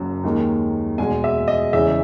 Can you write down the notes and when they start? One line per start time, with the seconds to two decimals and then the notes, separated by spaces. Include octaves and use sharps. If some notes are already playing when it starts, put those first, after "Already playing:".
Already playing: F#1 F#2 F#3
0.24 D#2 D#3 G#3
0.98 E2 B2 G#3 G#5
1.24 E5
1.48 D#5
1.73 E2 C#3 E3 G#3 E5